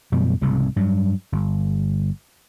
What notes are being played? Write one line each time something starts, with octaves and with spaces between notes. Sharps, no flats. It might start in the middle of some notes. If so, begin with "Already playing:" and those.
F#2 B2 F3 G3
F1 C2 G#2 C#3
G2 F#3
G1